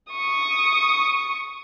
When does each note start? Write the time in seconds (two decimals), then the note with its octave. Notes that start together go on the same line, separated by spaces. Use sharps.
0.11 C#6 D#6